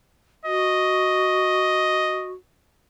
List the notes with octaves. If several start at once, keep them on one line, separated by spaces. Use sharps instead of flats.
F#4 D#5